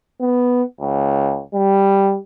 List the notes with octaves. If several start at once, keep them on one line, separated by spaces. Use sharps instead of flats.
B3
C#2
G3